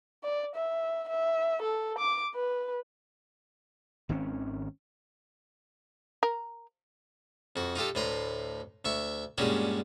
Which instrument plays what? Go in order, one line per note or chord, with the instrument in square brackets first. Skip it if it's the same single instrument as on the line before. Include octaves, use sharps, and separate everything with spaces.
[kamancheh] D5
E5
E5
A4
D6
B4
[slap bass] G#1 D#3 C4 C#4
[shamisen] A#4
[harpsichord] F2 F#4
D#4 F4 G4 A4
D2 A2 B4 A#5 C6
D2 E5 C#6
G2 A#2 G#3 C#4 F#4 G4